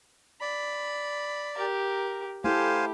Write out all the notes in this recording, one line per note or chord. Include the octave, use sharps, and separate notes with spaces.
D5 B5
G4 A#4
A3 E4 G4 A4 C5 F5 G#5